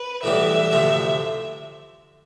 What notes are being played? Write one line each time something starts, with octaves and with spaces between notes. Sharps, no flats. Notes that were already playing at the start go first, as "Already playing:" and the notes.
Already playing: B4
B1 A2 E3 G3 B3 E5
D2 C3 F3 A3